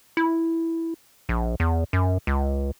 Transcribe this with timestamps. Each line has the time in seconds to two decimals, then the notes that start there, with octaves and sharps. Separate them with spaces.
0.17 E4
1.29 A#1
1.60 E2
1.93 F#2
2.27 C#2